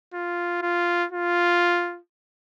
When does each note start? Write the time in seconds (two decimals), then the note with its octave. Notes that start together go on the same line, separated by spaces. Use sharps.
0.14 F4
0.62 F4
1.12 F4